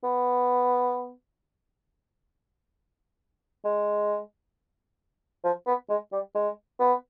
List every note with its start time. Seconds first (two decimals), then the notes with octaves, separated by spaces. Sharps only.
0.04 B3
3.65 G#3
5.44 F3
5.67 B3
5.89 G#3
6.12 G3
6.35 G#3
6.80 B3